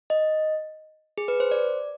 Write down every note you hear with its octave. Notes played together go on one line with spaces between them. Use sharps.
D#5
G#4
B4
C5
D5